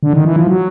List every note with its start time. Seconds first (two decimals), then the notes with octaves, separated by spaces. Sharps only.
0.03 D3
0.13 D#3
0.25 E3
0.36 F3
0.47 F#3